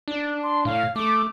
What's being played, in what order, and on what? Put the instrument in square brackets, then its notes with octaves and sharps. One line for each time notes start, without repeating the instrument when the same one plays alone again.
[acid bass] D4
[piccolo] C6
[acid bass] A2 [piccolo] F5
[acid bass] A3 [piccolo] D6